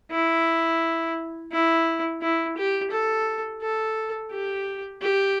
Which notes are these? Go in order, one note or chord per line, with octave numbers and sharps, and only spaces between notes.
E4
E4
E4
G4
A4
A4
G4
G4